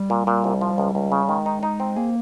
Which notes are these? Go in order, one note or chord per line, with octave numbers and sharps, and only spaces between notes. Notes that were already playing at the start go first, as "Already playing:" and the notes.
Already playing: G3
A#2
A#2
C2
F3
C#2
C#2
C#3
D#3 G#3
D#4
D#4
C4
A#3 G#4